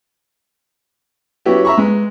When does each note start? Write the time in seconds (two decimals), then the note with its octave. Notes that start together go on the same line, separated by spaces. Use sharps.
1.46 F#3 B3 C#4 E4 F#4 G4
1.65 E5 A#5 B5 C#6
1.78 G#3 B3